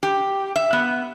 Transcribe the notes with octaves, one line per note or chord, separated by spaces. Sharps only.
G4
E5
B3